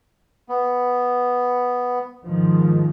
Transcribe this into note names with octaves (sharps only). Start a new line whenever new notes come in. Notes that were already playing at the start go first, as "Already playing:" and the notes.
B3
G#2 D#3 F3